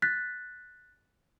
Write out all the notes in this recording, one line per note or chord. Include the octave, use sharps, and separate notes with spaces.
F#6 A6 B6